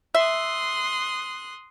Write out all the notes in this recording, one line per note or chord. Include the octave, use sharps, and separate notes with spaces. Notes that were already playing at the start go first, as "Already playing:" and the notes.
E5 C6 D#6 F#6